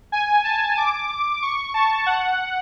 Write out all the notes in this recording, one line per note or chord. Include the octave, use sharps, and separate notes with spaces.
G#5
A5
D6
C#6
A5
F#5